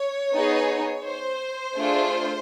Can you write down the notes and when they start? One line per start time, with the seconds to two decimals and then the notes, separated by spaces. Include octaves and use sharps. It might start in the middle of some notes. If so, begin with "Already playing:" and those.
Already playing: C#5
0.34 B3 D#4 G#4
1.05 C5
1.76 A3 D4 F4 G#4